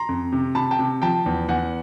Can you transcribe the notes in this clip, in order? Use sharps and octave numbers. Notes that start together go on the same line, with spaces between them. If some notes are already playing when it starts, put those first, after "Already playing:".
Already playing: A#5 C6
F2
C3
C3 A5 B5
G5 A5
C3
F3 G5 A5
E2
E2 F#5 G#5